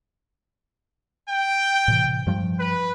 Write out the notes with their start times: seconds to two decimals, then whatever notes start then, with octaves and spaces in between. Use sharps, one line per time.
1.29 G5
1.88 A2 C3 E3
2.27 G2 F3 G3
2.59 B4